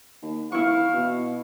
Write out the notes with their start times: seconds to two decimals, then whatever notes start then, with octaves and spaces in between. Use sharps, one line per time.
0.22 D#2
0.52 E3 E4 F5 C#6
0.93 B2